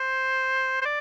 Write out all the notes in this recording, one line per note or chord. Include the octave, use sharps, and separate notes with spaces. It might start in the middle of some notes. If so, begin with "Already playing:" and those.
Already playing: C5
C5
D5